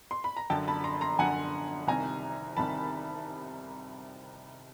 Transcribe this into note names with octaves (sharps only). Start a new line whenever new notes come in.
C6
B5
A#5
F#2 D3 G5 A5
A5 B5
A#5 C6
A#5 C6
F#2 D3 F#5 G#5
C2 C3 D#3 G#5 A#5
C2 C3 D#3 A5 B5